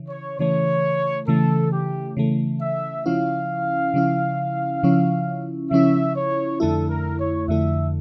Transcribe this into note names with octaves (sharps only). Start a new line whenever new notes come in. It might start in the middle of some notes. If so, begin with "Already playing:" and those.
Already playing: C#3 E3
C#5
C#3 E3 A3 C#5
C#3 E3 A3 A4
G4
C#3 E3 A3
E5
C#3 F3 C#4 E4 F5
C#3 F3 C#4 E4
C#3 F3 C#4 E4
C#3 F3 C#4 E4 E5
C#5
F2 D3 A3 E4 A4
A#4
C#5
F2 D3 A3 E4 E5